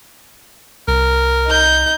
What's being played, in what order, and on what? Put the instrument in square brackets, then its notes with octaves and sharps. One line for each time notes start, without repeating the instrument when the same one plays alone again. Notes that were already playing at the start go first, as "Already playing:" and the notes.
[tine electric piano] C2 [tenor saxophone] A#4
[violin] D#4 G6